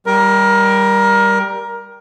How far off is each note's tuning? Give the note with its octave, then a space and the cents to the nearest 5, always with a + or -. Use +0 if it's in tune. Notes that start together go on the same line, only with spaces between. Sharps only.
G3 +0 A#4 +20